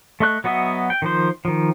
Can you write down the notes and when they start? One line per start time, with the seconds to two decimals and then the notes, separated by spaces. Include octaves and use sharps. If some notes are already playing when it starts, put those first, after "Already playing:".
0.20 A3 A4 D#5 C#6 F#6
0.44 F#3 B3 F#4 D#5 E5
0.90 G5
1.02 D#3 F3 C5
1.45 D#3 F3